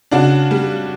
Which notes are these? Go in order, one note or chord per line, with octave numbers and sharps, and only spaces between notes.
C#3 D4 F#4
G3